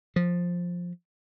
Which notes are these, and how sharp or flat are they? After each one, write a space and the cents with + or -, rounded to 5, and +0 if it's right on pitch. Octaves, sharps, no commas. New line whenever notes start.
F3 +10